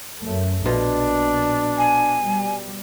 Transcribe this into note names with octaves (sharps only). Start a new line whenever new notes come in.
F#2 A3
A#1 B2 D4 F4
G#5
G3